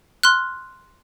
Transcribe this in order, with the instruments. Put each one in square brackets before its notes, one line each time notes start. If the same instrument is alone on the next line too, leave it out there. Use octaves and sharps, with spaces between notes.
[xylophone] C6 F6 F#6